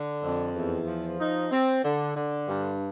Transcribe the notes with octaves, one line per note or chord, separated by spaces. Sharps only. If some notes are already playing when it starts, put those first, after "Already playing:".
Already playing: D3
F2
E2
F3
D#4
C4
D3
D3
G2